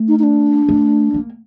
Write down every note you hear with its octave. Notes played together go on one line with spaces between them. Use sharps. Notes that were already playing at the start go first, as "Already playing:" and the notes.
Already playing: A3
D#4
D#4
D4
A3
A#3